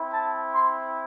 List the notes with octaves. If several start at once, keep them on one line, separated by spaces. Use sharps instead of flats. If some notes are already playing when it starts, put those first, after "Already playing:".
Already playing: C4 E4
A5
C6